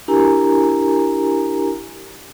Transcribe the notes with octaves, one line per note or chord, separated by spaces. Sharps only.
D4 E4 G4 A#4 G#5 A#5